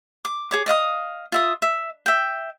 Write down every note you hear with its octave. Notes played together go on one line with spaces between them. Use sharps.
D6
G#4 C#5 D6
D5 D#5 F5 D#6
F4 E5 D#6
E5
E5 G5